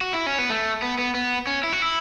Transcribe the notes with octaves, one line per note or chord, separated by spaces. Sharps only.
F#4
E4
C#4
B3
A3
B3
B3
B3
C#4
E4
F#4
E4